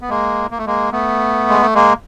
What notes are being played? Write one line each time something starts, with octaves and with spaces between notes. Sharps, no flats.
B3
G#3 A#3
A#3
A3
G#3 A#3
A3 B3
G#3
A3
G#3 A#3